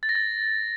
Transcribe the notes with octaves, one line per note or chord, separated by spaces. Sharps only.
A6
A#6
A6